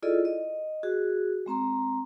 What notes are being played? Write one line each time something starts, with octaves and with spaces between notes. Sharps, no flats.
E4 F4 G#4 A4 D5 D#5
D#5
F#4 G#4
G#3 C4 A#5 C6